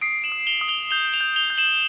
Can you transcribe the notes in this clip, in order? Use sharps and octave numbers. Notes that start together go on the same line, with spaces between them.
D#6 C7 D7
E7 F#7
D#6
F7 G7
D#6
F7 G7
G6 F7 G7
F7 G7
G6
F7 G7
G6
E7 F#7